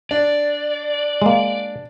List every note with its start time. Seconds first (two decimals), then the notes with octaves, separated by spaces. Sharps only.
0.11 D4 D5
1.22 G#3 A#3